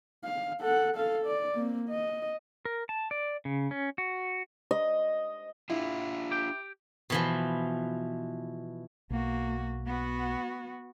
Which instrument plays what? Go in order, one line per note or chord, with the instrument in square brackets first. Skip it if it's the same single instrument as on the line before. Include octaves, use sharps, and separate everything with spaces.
[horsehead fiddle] F5
A4 F#5
A4 F5
D5
A#3 C4
D#5
[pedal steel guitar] A#4
A5
D5
C#3
C#4
F#4
[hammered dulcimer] D#5
[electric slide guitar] D4 F4 [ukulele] E4
[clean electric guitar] G4 G5
[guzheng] B2 E3 F3
[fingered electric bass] B1 [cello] A#3 F#4
[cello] B3 F#4